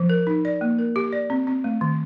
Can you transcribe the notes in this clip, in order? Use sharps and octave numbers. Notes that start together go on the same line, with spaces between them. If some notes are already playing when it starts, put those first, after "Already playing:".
Already playing: F3
A#4
D#4
D5
A#3
A#4
G4
D5
C4
C4
A3
D#3